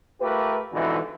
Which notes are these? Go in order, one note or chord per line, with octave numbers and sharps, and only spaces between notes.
A3 F4 G4 A#4 B4
F2 G#2 B2 D3 E3